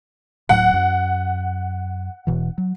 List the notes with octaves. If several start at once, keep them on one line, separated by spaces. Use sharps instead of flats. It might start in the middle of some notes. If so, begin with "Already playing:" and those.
D1 A2 F#3 F#5
F#2
E1 B2 E3
F#3